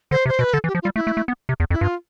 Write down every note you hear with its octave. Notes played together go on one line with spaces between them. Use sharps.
D3 C5
C3
C5
B2 B4
D3 A4
E3
G4
F3
F4
G3
A3 E4
A3
A3
B3
C3
E2
F2
E4
G2 F4